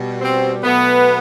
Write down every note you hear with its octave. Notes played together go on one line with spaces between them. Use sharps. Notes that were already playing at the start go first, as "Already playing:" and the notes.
Already playing: B2 G3
C4
B2 F#3 A3 B3